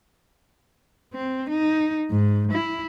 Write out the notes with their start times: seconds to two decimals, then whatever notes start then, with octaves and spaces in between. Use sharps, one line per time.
1.14 C4
1.50 D#4
2.10 G#2
2.52 E4